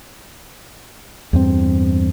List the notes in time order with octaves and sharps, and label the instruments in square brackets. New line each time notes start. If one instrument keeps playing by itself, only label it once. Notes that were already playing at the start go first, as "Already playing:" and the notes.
[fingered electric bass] E2 G2 C4